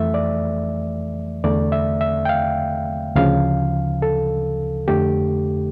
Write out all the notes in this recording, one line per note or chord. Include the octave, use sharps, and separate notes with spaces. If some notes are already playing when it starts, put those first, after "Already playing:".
Already playing: F2 E3 A3 E5
D5
E2 D3 A3 D5
E5
E5
G5
F5
D2 C#3 F3 F5
A4
F2 D3 A3 G4